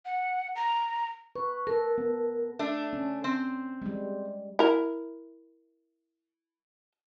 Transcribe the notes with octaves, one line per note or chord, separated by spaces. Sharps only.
F#5
A#5
B4 C#6
A4 A#4
B3
A3 D4
C#4
C4 C5
G3 G#3
E4 A#4